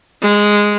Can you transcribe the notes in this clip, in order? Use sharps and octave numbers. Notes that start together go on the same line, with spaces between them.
G#3